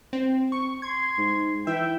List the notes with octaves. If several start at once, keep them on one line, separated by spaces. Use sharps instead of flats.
C4
C#6
C6 G#6
G#2
E3 E5 G5